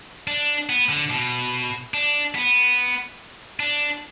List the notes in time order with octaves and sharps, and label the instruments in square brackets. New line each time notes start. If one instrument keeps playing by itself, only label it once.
[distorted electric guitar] D4
B3
D3
B2
D4
B3
D4